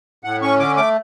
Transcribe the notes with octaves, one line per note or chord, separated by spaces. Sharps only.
A2 F#5
C#4 C#6
D3 D6
A3 D6